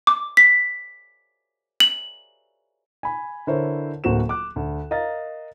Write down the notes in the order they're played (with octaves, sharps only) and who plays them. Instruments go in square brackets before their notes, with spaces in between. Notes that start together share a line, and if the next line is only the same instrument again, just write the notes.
[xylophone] D6
B6
F#7
[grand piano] G#5 B5
D3 E4 A#4 C5 C#5
D1 D2 A#3 F#4 C5 E7
D6 F#6
D2
A#4 D#5 F5 A#5 A6